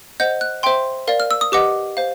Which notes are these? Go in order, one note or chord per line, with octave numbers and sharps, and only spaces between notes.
C5 D#5 F#5 G6
F#6
C5 E5 G5 C6
A#4 D5 F5
F6
E6
D#6
G4 B4 D#5 F#5 D6
C5 F5